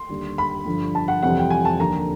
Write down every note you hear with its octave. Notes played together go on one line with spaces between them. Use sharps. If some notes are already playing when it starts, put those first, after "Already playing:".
Already playing: C6
D#2 D3 G3
B5
G2 D3 F3
A5
F#5
F2 C3 E3 G3 C4 F#5
G5
G#5
A5
D#2 D3 F3 A#3 A#5